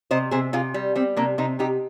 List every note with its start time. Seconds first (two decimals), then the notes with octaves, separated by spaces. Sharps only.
0.11 C3 C5 D#5
0.31 C3 G#4 C5
0.53 C3 F4 G#4
0.74 G3
0.95 G3 C4
1.17 C3 A#3 D4
1.38 C3 C4 D#4
1.59 C3 D#4 G4